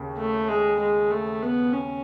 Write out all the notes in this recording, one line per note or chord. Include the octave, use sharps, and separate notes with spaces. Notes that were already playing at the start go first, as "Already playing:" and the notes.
Already playing: D#2 C#3
A3
G#3
G#3
A3
B3
C#4